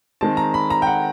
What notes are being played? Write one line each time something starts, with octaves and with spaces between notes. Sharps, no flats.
D#3 G#3 C4 A5
A#5
B5
A#5
G5
F#5